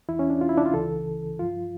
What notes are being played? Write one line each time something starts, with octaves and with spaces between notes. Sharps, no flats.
E2 E3 E4
C#4
D4
F4
E4
D4
F4
C#2 C#3 E3 A4
G2 F3 F4